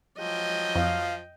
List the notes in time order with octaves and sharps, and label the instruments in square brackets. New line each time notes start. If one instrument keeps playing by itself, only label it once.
[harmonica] F3 F#3 [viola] D#5 G5
[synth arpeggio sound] F2 [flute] F5